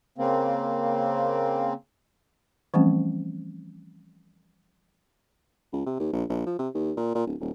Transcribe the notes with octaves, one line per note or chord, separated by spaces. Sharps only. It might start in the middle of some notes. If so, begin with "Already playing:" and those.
C#3 A#3 C4
E3 F3 G3 A3 C4 C#4
C#2
C3
D#2
A#1
A#1
F3
C3
D#2
A#2
A#2
D1
D#1